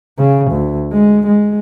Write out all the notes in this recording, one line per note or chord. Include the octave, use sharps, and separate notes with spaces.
C#3
D2
G#3
G#3